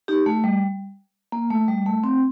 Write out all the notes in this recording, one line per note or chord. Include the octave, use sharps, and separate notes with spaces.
D#4 G4
A3
G3
A#3
A3
G3
A3
C4